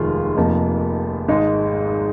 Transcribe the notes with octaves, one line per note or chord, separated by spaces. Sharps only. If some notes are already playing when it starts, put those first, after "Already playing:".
Already playing: F1 D#2 D#3 G#3 F4
F1 F2 F3 A#3 D#4
G#1 G#2 G#3 D#4